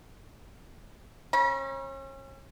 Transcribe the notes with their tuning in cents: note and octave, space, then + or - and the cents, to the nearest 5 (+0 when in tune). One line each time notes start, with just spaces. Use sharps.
C#4 -35 B5 -45